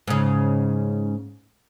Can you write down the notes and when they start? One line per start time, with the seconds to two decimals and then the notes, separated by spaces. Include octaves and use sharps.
0.08 G#2 C#3